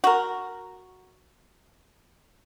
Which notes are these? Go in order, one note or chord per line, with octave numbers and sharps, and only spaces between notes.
F#4 A#4